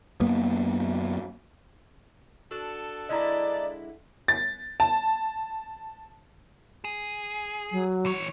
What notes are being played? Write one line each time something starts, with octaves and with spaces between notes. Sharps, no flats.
F#2 A#3 B3
D4 F#4 A4
D3 G#3 E4 D5 D#5 A#5
A6
A5
G#4
F#3
E3 C#5